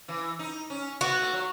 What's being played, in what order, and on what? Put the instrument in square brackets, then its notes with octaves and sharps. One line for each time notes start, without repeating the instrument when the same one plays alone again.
[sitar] E3
D#4
C#4
[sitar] B3 [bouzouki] F#4
[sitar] A3
F#3